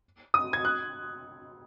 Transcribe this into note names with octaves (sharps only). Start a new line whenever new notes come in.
D#6
G#6
F#6